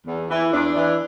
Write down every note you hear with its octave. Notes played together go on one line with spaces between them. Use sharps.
E2
E3
E2 D4
E3